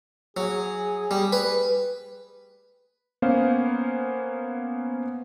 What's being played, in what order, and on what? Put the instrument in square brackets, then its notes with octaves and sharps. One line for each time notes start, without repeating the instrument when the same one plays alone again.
[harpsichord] F#3 [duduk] G#4
[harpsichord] G3
B4
[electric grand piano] A#3 B3 C#4 C5 F5